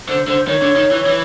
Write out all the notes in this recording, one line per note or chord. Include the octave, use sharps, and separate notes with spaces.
D3 C5
D3 C5
D#3 C#5
D3
D#3
E3
E3